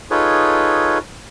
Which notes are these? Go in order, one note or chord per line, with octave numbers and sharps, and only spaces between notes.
D#4 F4 G#4 A4 B4 C#5